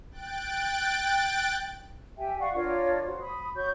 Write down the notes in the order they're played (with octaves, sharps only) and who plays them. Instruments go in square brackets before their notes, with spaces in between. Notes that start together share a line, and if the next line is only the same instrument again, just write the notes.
[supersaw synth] G5 F#6 A6 D7
[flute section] G4 E5 G5 G#5
D5 F5 F#5 C#6
D4 F4 A#4 C#5
F#4 C5
B5 D#6
F#4 C#5 C#6 G6